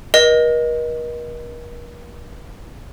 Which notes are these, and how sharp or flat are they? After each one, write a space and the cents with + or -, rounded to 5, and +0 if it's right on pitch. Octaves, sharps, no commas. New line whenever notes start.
A#4 +40 D#5 +0